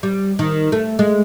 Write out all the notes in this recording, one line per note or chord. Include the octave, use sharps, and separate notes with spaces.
G3
D#3
A3
G#3